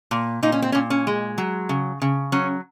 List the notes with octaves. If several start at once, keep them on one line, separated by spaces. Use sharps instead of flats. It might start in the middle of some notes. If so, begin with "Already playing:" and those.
A#2
A#2 D#4
C#4
C4
A#2 C#4
C#4
G#3
F#3
C#3
C#3
F#3 C#4